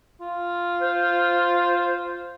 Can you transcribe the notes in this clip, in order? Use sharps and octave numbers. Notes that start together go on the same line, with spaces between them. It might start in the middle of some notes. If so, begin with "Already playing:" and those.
F4
C5